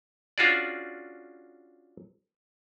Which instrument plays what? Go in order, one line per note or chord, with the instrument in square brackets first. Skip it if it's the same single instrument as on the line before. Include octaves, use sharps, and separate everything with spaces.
[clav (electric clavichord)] C#4 D4 F4 F#4 G#4 D5